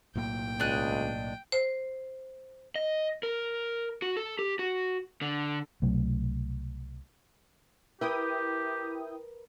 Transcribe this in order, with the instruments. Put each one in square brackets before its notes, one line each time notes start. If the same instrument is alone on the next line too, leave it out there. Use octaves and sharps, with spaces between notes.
[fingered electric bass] B1 A2 A#3 [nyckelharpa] G5
[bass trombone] C#2 [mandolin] D4 D#5 F#6
[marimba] C5
[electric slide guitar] D#5
A#4
F#4
A4
G4
F#4
D3
[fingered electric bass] C2 B2 F#3 A3
[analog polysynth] E4 G5 D#6 [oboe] G4 [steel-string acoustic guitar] A#4 B4